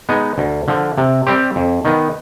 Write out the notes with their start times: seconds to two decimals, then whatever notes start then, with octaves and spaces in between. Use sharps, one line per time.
0.09 G#3 B3 D#4
0.38 D2
0.68 D3 F3
0.98 C3
1.27 G3 C4 G4 C5
1.56 F2
1.85 D#3 B3 D#4